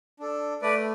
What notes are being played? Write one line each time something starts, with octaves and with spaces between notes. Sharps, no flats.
D4 A4
A3 B4 D5